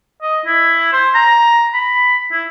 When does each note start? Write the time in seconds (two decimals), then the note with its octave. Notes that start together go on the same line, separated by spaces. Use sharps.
0.23 D#5
0.46 E4
0.93 C5
1.15 A#5
1.74 B5
2.32 E4